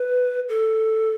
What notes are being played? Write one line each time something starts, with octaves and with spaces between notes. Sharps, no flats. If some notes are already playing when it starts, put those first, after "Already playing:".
Already playing: B4
A4